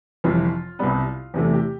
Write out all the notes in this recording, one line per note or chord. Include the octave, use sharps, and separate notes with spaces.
G1 F2 C3 E3 F4
C2 C3 G3 B3
E2 C3 E3 A3
G4